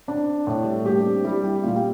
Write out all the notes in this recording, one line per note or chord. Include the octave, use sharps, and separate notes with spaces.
C4 D4
A2
G3
A3
A#3 G4
D4
C4
G3 E4
G4
A#2 F4
G4